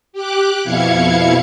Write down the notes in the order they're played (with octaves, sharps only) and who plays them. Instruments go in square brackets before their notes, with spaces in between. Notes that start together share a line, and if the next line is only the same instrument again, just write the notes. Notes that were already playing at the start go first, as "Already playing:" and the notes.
[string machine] G4 D6 F#6
F2 B2 E4 F5 G#6 C#7